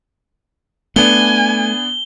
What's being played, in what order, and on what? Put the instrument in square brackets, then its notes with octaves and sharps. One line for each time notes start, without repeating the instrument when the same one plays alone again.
[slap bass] A3 [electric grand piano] B3 D4 [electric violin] G#5 [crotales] G7